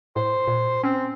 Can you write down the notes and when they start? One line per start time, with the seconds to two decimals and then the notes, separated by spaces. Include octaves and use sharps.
0.16 A2 C5
0.47 A#2
0.83 C4 C#4